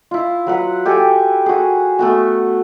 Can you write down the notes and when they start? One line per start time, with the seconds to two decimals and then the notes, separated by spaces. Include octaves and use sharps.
0.11 E4 F4
0.46 F#3 B4 F#5
0.85 G4 A4 G#5
1.46 F#4 G#4
1.99 A3 B3 F#4